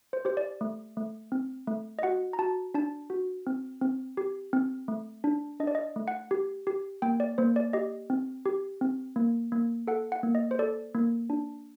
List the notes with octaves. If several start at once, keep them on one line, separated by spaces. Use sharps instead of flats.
C5
G4 C5
D5
A3
A3
C4
A3
D#5
F#4 F#5
A#5
F#4 A5
D4 A5
F#4
C4
C4
G4
C4
A3
D4
D4 D#5
D5
D#5
A3
F#5
G4
G4
A#3 G5
D5
A#3 C5
D5
G4 D#5
C4
G4
C4
A#3
A#3
A4 F#5
F#5
A#3
D#5
C5
A4 D5
A#3
D4